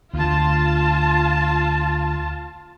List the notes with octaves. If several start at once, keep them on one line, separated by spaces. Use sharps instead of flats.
D2 F4 A5